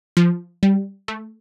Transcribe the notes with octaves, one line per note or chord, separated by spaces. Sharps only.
F3
G3
A3